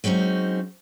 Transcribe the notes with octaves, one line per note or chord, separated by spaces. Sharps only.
F#3 G#3 C4 C#4 D#4